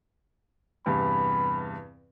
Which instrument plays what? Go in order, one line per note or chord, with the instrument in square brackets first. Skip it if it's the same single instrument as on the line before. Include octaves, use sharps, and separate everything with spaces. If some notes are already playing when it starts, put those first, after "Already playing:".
[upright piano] E2 G2 C3 [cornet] B5